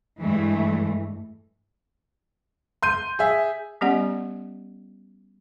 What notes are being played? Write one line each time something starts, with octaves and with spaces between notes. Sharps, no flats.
G2 E3 G#3 A3
C6 G6 D#7
G#4 E5
G3 B3 C#4 G4 D5 F#5